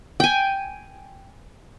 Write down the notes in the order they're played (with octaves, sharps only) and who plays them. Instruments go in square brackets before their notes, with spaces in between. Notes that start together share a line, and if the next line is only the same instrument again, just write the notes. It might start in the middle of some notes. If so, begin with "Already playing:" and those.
[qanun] G5 G#5